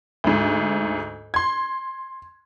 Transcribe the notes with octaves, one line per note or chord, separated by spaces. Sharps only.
D2 G#2
C6 G#6